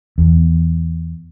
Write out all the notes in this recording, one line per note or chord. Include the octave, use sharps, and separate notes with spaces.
E2